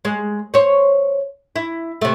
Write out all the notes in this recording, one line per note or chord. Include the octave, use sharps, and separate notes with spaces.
G#3
C5 C#5
E4
C3 A3